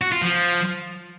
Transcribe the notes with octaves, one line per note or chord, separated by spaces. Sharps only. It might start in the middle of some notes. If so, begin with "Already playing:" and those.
F#4
F4
F3